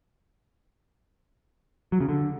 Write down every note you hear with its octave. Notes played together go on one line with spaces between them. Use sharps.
F#3
C#3
D3